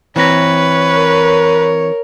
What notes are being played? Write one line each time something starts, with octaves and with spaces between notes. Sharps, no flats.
E3 C4 B4 C#5 A#5
A#4